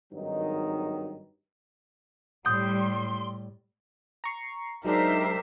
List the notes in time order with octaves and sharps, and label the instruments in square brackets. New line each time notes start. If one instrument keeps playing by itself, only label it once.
[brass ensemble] G#1 G2 D#3 F#3 D#4
[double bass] A2 [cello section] G3 [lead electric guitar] C6 [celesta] D#6 G6
[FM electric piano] A#5 C#6 C7
[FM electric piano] F#3 G#3 D4 [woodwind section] D#4 [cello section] G4 C5 E5 [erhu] A#4